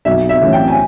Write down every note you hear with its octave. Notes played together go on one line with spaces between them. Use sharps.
B1 E5
E5
A2 E3 A3 C#4
G5
G#5